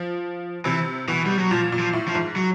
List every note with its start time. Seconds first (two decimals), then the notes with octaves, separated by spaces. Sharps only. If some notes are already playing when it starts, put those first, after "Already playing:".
Already playing: F3
0.65 C3 E3
1.08 B2 E3
1.26 G3
1.38 F#3
1.51 A#2 F3
1.72 A#2
1.79 F3
1.93 A2
2.08 F3
2.15 G#2
2.36 F#3